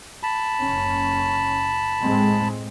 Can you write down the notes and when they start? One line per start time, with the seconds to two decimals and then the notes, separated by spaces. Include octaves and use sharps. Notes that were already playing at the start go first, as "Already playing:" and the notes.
0.23 A5 B5
0.61 F#1 C#4
2.00 A2 G#3 C4